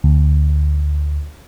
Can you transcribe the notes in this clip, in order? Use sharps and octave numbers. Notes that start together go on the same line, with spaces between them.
D2